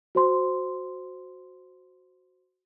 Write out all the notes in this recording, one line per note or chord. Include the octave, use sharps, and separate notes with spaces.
F#4 C5 C6